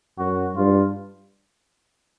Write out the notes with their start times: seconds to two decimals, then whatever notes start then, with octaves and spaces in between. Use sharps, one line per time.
0.18 F#2 F#4
0.56 G2 F4